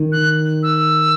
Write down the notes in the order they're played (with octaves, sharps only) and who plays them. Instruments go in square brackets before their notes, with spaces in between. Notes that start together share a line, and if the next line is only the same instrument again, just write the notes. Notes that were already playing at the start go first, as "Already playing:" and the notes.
Already playing: [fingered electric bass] D#3
[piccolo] F#6
E6